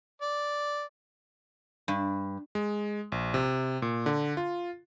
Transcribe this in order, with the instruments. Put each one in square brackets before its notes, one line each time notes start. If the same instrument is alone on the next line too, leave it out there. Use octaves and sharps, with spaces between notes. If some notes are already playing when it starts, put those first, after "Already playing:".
[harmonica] D5
[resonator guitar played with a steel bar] G2
[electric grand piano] G#3
A#1
C3
A#2
D3
F4